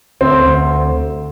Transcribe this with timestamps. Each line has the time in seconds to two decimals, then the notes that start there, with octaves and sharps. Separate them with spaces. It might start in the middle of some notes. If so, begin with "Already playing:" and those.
0.21 D2 C4
0.46 D2